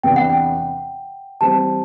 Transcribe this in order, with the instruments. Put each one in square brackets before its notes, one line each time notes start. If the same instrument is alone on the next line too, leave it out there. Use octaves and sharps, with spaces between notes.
[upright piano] E2 C3 E3 B3 D4 [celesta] G5
[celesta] F#5
G5
[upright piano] E3 G3 C4 [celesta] A5